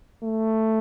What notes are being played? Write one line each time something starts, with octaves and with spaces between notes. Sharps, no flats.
A3